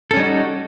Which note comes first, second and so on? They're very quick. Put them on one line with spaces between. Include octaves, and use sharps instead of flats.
A4 C#4 G3 D#4 F#4